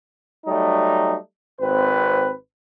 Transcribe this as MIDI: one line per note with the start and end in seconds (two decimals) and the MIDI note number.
0.47 1.15 54
0.47 1.15 55
0.47 1.15 57
0.47 1.15 63
1.59 2.30 32
1.59 2.30 60
1.59 2.30 71
1.59 2.30 72